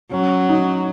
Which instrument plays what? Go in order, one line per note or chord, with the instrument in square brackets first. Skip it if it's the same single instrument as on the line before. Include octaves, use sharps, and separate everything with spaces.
[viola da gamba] F#3 [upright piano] C#4
[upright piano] D#4